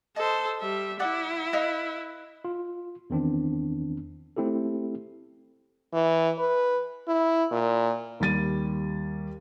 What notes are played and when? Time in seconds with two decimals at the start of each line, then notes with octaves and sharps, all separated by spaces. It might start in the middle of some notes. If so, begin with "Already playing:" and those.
0.16 A4 C5 D#5 D#6
0.60 G3 E5
0.99 E4 D5 F#5 D6
1.53 B4 D#5 F5
2.45 F4
3.10 E2 D#3 C4 D4
4.37 A3 C4 E4 G4 A4
5.94 E3
6.39 B4
7.08 E4
7.51 A#2
8.20 D#2 G3 A6 D#7